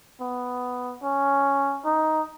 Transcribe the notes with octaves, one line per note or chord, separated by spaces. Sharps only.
B3
C#4
D#4